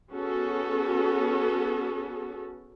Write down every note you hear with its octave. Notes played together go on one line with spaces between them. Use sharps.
B3 C#4 F#4 G#4 A4